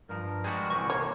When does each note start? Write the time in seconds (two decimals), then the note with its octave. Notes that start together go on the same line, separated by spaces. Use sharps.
0.09 G2 F3 A#4
0.44 G3 G#3 F#4 G#4
0.70 C2 E3 C#6
0.90 A#3 C#5